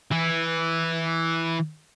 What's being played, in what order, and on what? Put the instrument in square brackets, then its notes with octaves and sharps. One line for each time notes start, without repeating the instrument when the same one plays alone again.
[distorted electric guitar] E3 E4